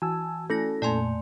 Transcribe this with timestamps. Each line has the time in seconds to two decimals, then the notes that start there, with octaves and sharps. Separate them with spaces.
0.02 E3 F#4 G#5 A5 E6
0.50 A3 C#4 E4 A4 A#6
0.82 F2 A#2 A3 D5 G#5 C6